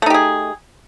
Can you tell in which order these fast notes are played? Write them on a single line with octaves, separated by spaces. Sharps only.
A3 D#4 G4 G#4